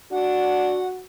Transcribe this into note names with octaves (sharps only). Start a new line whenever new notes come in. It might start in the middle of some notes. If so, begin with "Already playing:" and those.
D4 F#4 F#5